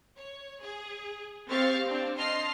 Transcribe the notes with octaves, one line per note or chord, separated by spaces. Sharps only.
C#5
G#4
C4 G4 F5 C#6 F6 A6
C4 D4
D#5 A5 C6 F6 C7